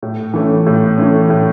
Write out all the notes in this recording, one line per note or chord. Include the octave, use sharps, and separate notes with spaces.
A2
E3 A3 C#4
A2
E3 A3 C#4
A2